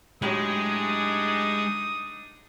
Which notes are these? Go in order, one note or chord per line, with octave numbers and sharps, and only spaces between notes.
A2 F#3 G#3 D4 D#4 G4 D#6